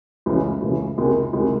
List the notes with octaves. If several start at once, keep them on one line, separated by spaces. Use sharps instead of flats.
C#2 C#3 E3 A3
C#2 C#3 E3 A3
C#2 C3 D#3 G#3
C#2 C3 D#3 G#3